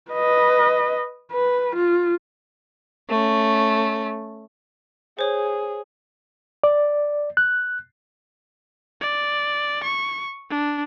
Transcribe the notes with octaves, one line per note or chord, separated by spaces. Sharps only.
B4 D#5
B4
F4
A3 C#4
G#4 C5 C#5
D5
F#6
D5
C#6
D4